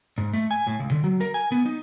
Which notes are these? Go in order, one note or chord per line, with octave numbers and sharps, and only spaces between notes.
G#2
A3
G#5
A2
C#2
D3
F#3
A#4
G#5
B3
D#4